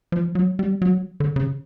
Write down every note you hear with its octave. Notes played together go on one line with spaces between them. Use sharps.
F3
F#3
G3
F#3
D3
C#3